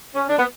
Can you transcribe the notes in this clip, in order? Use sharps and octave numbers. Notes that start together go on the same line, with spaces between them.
C#4
D4
B3